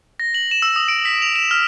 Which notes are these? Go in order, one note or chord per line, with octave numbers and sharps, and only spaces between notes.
A#6
F#7
E7
E6
D#6
D7
B6
F7
E7
F6